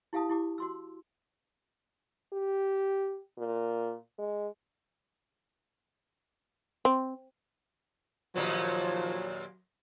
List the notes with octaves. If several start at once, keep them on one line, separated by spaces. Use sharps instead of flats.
E4 G4 F5 A5 D#6
E4 G4 D6
F#4 C6 E6
G4
A#2
G#3
C4
D#2 A#2 F3 F#3 B3